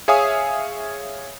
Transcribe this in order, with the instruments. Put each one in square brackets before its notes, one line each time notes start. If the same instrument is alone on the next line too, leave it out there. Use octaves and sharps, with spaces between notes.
[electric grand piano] G#4 C#5 E5 F5 G#5 D#6